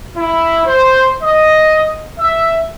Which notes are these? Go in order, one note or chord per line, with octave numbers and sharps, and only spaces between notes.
E4
C5
D#5
E5